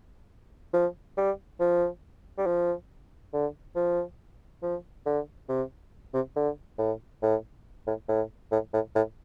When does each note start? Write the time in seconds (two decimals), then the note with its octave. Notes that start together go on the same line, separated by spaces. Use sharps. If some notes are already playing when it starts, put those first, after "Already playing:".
0.73 F3
1.17 G3
1.60 F3
2.38 G3
2.46 F3
3.33 D3
3.76 F3
4.63 F3
5.06 D3
5.49 C3
6.14 C3
6.36 D3
6.78 A2
7.22 A2
7.87 A2
8.08 A2
8.51 A2
8.73 A2
8.95 A2